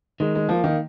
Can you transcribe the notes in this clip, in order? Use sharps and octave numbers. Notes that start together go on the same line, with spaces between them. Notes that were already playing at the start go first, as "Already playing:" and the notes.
D#3 G#3
G#3
F3 A#3
D#3